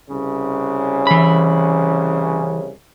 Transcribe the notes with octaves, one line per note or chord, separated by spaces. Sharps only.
C2 C#3 C#4
E3 B5